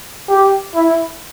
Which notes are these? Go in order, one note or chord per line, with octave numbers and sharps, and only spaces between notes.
G4
E4